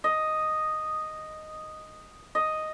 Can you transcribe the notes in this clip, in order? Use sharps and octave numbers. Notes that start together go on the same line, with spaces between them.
D#5
D#5